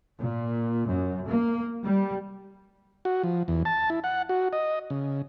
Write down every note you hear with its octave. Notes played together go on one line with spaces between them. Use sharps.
A#2
F#2
A#3
G3
F#4
F3
E2
A5
E4
F#5
F#4
D#5
C#3